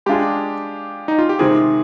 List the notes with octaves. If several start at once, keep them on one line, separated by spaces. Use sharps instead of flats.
G#3 D4 F4 G4 G#4
D#4
F4
G4
C3 D#3 G#3 C4 G#4